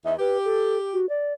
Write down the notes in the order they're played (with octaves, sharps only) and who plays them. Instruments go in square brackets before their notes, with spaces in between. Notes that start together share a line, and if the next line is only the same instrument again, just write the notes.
[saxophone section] E2 D#4 [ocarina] E5
[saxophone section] G4 [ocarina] B4
[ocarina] A4
F#4
D5